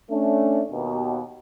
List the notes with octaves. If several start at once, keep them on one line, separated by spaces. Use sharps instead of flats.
A3 C#4 D4
D#2 B2